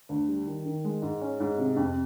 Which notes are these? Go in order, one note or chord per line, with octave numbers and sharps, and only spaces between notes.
D2
G3
D#3
D#3
G#3
G#2
C#4
G#2
C3
F2